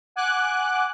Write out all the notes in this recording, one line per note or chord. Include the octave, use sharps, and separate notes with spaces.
F#5 G#5 D6 F#6